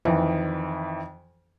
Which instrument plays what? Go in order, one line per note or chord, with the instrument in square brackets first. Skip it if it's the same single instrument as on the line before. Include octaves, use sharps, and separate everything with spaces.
[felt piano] F2 D#3 E3